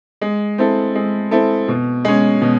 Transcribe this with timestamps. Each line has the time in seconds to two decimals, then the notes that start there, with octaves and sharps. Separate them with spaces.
0.21 G#3
0.58 C4 E4 A4
0.95 G#3
1.31 C4 E4 A4
1.68 B2
2.05 G#3 C#4
2.42 B2